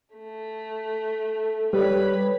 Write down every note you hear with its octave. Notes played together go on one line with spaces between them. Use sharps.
A3
G3 B4 C#5 B5